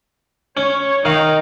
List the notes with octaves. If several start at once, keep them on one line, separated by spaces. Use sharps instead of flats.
C#4 C#5
D#3 D#4 F5